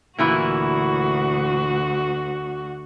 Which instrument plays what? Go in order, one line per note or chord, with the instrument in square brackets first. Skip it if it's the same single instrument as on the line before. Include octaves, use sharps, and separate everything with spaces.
[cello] D2 F#4 [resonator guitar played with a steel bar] A#2 E3 E4